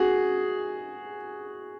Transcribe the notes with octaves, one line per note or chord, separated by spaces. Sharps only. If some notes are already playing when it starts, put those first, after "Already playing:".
Already playing: F#4 G#4